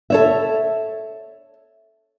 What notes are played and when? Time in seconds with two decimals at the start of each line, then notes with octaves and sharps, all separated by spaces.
0.10 A4 C#5 E5